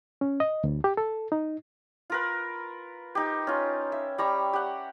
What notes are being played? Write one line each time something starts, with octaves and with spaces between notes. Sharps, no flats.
C#4
D#5
D2
G4
A4
D#4
F4 A#4 B4
D#4 G4
C#4 F4
E5
G3 A#5 C#6 E6
G4 F#5